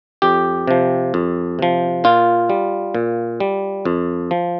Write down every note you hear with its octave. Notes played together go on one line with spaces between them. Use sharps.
F2 G4
C3 F3
F2
C3 F3
A#2 F4
G3
A#2
G3
F2
F3